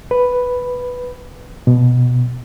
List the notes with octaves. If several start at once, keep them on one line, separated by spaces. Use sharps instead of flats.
B4
B2